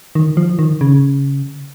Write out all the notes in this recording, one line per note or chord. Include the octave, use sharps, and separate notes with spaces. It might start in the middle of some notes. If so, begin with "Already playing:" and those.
D#3
F3
D#3
C#3